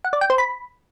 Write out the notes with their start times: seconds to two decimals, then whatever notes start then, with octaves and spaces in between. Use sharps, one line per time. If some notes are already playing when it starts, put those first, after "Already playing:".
0.04 F#5
0.13 D5
0.21 G5
0.30 C5
0.38 B5